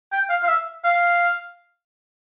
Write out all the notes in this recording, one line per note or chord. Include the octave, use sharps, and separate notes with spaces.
G5
F5
F5
E5
F5